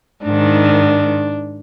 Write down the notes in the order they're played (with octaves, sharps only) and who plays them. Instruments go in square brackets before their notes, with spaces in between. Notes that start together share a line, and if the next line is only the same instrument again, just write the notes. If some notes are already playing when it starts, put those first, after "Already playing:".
[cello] G#2 D#3 [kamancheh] D4